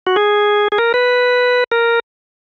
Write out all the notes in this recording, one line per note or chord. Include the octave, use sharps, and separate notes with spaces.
F#4
G#4
G#4
A#4
B4
A#4